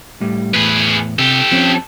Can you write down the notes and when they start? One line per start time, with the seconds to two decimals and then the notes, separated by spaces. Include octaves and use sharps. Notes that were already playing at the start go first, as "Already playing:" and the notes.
0.21 A2 G3
0.54 E2 A2 G#4 B4
1.19 C3 G4 A4
1.51 F3 C4 C#4